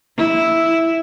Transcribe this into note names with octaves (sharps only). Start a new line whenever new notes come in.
E4